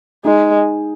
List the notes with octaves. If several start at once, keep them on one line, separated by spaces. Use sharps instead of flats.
G#3 D#4